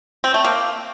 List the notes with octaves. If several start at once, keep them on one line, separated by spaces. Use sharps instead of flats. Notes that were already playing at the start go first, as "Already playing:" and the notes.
C4
A3
A#3